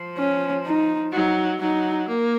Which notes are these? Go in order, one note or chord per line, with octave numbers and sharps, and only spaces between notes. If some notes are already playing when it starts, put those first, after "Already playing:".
Already playing: F3
C#4
D#4
F#3 D#4
F#3 D#4
A#3